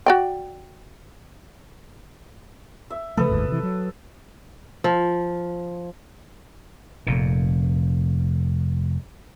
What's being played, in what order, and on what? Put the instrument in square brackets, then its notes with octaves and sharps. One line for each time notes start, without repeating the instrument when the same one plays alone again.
[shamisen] F#4 D5 G5
[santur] E5
[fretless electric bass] C#3 F3 A3 [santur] A4 B4 D#6
[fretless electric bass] F#1 D2 G#2
C3 E3
F#3
[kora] F3
[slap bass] F1 F2 A#2